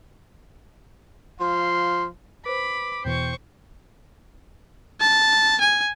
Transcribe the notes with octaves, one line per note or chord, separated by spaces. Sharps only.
F3 F5 C6
B4 C5 B5 D6
E2 B2 E3 C5 G5 C#6
A5
G#5